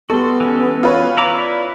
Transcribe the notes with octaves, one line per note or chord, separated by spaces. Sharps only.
G3 B3 F#4 A4 C6
E3 G#3 C#4
F4 B4 C#5
E4 A#5 D6
E4 D5